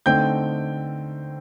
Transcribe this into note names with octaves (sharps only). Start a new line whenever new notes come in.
D3 A3 C4 D#4 G5 G6